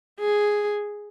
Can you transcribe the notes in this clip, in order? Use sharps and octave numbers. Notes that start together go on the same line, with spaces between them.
G#4